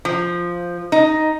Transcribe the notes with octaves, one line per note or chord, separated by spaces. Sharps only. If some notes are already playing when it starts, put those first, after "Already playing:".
F3
D#4